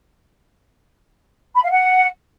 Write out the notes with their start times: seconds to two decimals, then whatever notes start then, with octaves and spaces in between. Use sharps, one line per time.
1.55 B5
1.62 F5
1.70 F#5